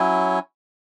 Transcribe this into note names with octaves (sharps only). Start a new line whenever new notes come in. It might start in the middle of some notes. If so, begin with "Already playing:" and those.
Already playing: F#3 C#4 E4